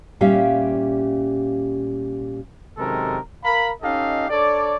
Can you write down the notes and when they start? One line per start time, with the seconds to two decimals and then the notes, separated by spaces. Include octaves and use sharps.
0.21 A#2 G3 C#4 G4 E5 F5
2.78 F#2 C3 D#3 G#3 A4 A#4
3.44 A#4 F5 A#5 B5
3.83 C#4 D#4 G4 A4 D#5 F5
4.29 D4 A4 C#5 D5